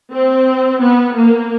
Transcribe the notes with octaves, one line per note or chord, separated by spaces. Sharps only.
C4
B3
A#3